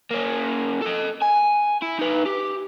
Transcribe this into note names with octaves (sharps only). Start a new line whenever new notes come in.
A#3 C#4
A4 D#5
G#5
E4
D#4 B4
G4